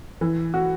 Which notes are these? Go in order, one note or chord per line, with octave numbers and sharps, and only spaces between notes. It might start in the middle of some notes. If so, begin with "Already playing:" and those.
E3
F#4